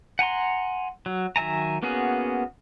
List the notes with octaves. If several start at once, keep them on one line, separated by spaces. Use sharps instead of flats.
F#5 G#5 A#5 C6
F#3
D#3 F#3 E5 G#5 A#5
A#3 B3 C#4 F#4 G#4